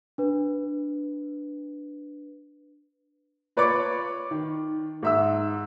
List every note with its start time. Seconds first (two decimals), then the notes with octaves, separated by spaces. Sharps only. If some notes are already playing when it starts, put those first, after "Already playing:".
0.18 D4 B4
3.57 F4 B4 C#5 D5 C#6 D6
4.31 D#3
5.03 G#2 E5 E6